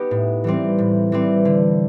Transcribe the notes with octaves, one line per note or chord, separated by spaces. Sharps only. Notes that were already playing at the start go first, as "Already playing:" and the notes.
Already playing: B3 D#4 G4
A2
E3 G3 C4
A2
E3 G3 C4
D3